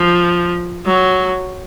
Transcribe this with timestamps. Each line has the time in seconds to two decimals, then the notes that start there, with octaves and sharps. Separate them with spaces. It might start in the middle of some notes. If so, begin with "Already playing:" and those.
Already playing: F3
0.86 F#3